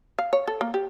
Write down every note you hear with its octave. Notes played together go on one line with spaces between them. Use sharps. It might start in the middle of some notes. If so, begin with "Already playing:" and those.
F5
C#5
A4
A#3
G4